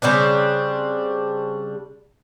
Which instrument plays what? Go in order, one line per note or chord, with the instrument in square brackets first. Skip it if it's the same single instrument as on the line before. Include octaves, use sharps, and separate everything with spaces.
[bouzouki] C#3 G3 C4 D4